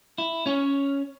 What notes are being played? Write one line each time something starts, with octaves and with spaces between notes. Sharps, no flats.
E4
C#4 C#5